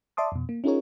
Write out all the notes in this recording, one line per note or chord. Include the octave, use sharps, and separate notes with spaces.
D5 E5 A5 C6 D6 D#6
F2 B2
A#3
C#4 D#4 F4 G#4 A#4 C#5